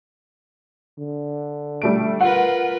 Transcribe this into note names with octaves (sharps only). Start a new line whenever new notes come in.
D3
G3 A3 D7
F4 A#4 B4 F#5